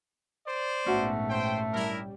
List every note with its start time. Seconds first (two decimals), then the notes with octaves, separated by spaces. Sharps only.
0.46 C5 D5
0.86 A#1 G#2 A3 B3 C#4 F#4
1.29 C5 G5
1.73 G3 D4 E4 A#4